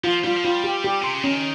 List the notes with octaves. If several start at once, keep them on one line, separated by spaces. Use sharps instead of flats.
F3 F4
G3 F4
F3
G3 F4
G4
G4
C3 C6
C#3
D#3 C#4